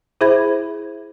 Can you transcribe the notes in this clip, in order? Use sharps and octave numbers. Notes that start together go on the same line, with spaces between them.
E4 G#4 C5 E5 B5 G#6